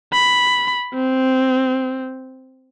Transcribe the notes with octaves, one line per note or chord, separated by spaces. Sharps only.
B5
C4